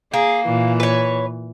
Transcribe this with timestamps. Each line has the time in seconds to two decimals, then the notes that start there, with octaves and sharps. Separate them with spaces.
0.13 A#3 G#4
0.46 A#2 E3
0.80 B4 C#5